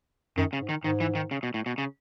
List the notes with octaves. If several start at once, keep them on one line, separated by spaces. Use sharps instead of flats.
F#2 D#3
C#3
G#2
D#3
G#2 D#3
E3
D#3
C#3
B2
A2
B2
C#3